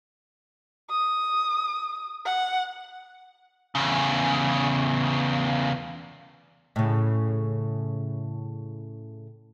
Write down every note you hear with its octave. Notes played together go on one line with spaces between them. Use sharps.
D#6
F#5
E2 C#3
A2 C#3